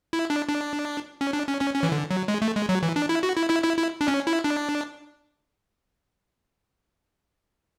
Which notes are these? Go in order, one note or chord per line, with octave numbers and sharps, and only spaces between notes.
E4
D4
D4
C#4
D4
C#4
C#4
C#4
E3
D3
F#3
G#3
A3
G#3
F#3
E3
D4
E4
F#4
E4
E4
E4
E4
D4
C#4
E4
D4